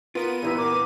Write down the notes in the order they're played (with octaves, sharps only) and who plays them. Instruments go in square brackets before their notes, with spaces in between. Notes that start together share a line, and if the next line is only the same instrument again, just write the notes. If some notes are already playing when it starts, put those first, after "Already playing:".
[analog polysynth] B3 D#7 [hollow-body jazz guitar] F4 A#4
[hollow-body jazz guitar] E2 A#2 A#5 [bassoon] G2 [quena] E4
[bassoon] A#4 [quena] D6